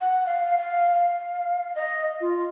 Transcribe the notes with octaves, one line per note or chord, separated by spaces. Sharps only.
F#5
F5
F5
F5
D#5
F4